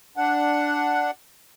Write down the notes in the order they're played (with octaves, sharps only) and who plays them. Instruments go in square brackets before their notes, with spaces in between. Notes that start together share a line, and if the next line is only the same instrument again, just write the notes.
[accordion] D4 F#5